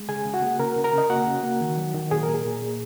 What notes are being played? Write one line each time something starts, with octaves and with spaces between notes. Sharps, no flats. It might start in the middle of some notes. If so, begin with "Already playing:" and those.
Already playing: G#3
C#3 G#4 G#5
C#3
F#4 F#5
A#3
C#3 A#4 A#5
C#3
A#4 A#5
C#3
D#5
A#3 F#4 F#5
C#3
A#3
D#3
F#3
D#3
A#2 G#4
A#4
A#2
G#4
A#2
A#3